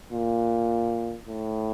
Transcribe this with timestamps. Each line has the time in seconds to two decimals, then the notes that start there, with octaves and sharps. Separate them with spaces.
0.12 A#2
1.27 A2